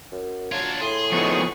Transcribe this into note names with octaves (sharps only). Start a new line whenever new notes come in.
F#2
F#3 D4 F4 G#6
A2 G#4 C6
F3 B3 D#4 C#6